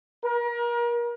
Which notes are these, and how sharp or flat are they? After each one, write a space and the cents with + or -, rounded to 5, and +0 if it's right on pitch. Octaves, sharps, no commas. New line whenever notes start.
A#4 +35